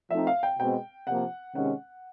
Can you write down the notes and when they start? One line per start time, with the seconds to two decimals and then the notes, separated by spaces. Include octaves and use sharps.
0.11 F3 A3 C4 D#4 E5
0.27 F5
0.43 G5
0.59 B2 G#3 C4 G5
1.07 C3 F3 A#3 F#5
1.55 C3 D#3 G#3 C#4 F#5